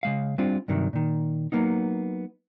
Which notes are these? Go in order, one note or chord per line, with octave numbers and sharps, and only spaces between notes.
C#3 G#3 F5
G3 C4 D4 F4
G2 C3 D#3 F#3
A#2 D#3
F#3 A#3 B3 D#4